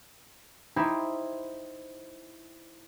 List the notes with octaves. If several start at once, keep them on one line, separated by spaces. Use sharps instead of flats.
D#4 E4 G4 C5